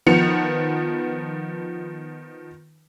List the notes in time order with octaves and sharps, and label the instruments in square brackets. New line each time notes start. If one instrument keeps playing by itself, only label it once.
[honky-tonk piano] D#3 F3 B3 C#7 F7